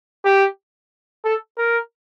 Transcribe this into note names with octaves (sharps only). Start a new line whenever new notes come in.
G4
A4
A#4